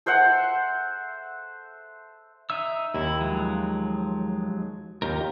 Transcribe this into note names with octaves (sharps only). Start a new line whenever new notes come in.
A4 C5 E5 F#5
D#4 E5 E6
D#2 E4
F3 F#3 G#3
D#2 F4 G4 A#4